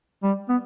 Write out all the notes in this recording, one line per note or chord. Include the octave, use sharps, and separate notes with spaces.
G3
B3